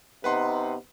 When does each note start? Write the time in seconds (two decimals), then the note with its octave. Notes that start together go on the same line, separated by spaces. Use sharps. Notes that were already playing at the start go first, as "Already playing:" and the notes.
0.24 C3 B3 D#4 B4 F#5 C6